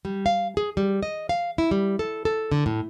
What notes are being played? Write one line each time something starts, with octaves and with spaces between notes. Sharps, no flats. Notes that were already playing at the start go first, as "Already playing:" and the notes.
G3
F5
G#4
G3
D#5
F5
E4
G3
A4
A4
D3
A2